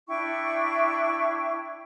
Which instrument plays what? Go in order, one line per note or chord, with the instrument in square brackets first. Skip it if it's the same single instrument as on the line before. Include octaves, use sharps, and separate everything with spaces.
[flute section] D4 E4 G5 C#6